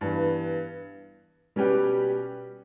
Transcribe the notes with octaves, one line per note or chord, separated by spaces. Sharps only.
G2 E3 B3
B2 G3 C#4 G4 B4